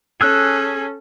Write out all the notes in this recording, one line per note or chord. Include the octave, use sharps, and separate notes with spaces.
C#4 G#4 A4 E6 F#6